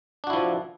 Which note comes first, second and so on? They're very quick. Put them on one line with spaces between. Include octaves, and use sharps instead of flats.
D4 F#4 E4 F3